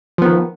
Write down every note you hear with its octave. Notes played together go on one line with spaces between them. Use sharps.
D#3 F3 B3